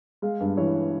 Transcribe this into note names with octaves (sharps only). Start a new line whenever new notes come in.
G#3 F5
G2
E3 C#5